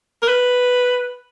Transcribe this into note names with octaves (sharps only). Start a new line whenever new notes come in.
A#4
B4